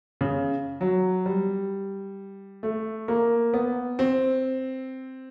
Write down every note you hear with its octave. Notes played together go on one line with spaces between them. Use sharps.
C#3
F#3
G3
A3
A#3
B3
C4